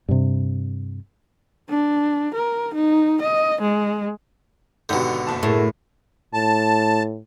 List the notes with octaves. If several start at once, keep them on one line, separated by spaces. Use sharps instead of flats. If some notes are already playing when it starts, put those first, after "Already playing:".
G2 C3
D4
A#4
D#4
D#5
G#3
G#1 B2 D3 D#4 G4
F#1 A5
A2 E4 G#4 A#4
A2 A5